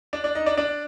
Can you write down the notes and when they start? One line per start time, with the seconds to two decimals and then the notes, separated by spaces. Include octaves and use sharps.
0.13 D4 D5
0.24 D4 D5
0.35 D#4 D#5
0.46 D4 D5
0.57 D4 D5